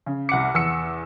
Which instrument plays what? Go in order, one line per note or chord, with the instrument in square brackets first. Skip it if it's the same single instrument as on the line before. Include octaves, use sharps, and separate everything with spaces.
[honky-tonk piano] C#3
[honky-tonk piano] C2 C#7 [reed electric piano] F#5 D6
[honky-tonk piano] E2 E6 C#7